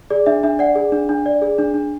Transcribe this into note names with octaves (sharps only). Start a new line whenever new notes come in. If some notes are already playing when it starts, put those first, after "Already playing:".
G#4 D5
D4 E5
D4 E5
D5 F#5
G#4
D4
D4
D5
G#4
D4
D4